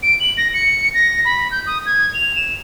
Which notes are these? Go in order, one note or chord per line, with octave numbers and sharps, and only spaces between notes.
D7
F#7
A#6
C#7
A#6
B5
G6
D#6
G#6
F7
E7